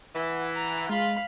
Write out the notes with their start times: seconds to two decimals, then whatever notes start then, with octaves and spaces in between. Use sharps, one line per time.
0.15 E3 F#5
0.56 A#5
0.89 G#3 F4 F5 B5